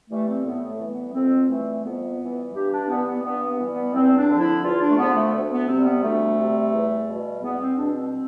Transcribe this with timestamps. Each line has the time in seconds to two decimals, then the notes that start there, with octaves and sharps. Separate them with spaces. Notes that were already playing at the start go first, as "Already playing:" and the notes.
0.10 E3 G3 A3
0.27 C4
0.44 A2 B3
0.68 A3
0.79 E3 G3
0.91 B3
1.14 F2 C4
1.49 E3 G3 A3
1.84 F2 B3
2.20 E3 G3
2.53 G2 G4
2.71 D4
2.88 E3 G3 B3
3.06 B3
3.23 G2 B3
3.47 B3
3.59 E3 G3
3.70 B3
3.93 E2 C4
4.17 D4
4.28 D3 F3
4.40 E4
4.63 E2 F4
4.81 D4
4.90 A3
4.98 D3 F3 B3
5.16 A3
5.33 D2
5.51 B3
5.67 C3 G3 C4
5.85 B3
6.02 D2 A3
6.37 C3 G3
6.72 E2
7.07 B2 G3
7.42 E2 B3
7.59 C4
7.76 B2 G3 D4
7.94 C4